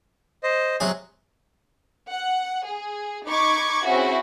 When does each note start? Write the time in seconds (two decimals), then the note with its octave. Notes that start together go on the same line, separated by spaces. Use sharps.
0.43 C5 D#5
0.80 C3 F#3 G#4
2.11 F#5
2.66 G#4
3.26 D#4 B5 C#6 D6 G#6
3.85 C4 C#4 E4 F#4 G#4